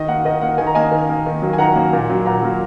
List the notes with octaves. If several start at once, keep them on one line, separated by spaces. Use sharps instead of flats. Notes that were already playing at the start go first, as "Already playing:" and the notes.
Already playing: D#3 D#5
A#3 F#5
D#3 D#5
A#3 F#5
D#3 G#5
A#5
A#3 D#5 G#5
D#3
A#3
D#3
F#3 A#3
G#5
D#3 F#5 A#5
F#3 A#3
A#2
F#3 A#3
A#2 F#5 A#5
F#3 A#3